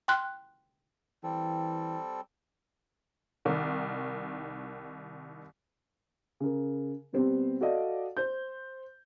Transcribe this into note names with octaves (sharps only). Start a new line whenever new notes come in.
G5 C6 F6 F#6
E3 G3 C4 A4
C2 D#3
C#3 A#4
B2 G3 B3 C4
F#4 A4 D5 D#5 F5
C5 G6